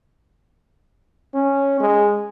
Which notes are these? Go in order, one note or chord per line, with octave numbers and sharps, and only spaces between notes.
C#4
G#3